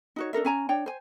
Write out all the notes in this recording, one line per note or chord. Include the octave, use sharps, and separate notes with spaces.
D#4 F#4 C#5
D4 A4 A#4 E5
C#4 G#5 A#5
D4 C#5 G5
C5 G#5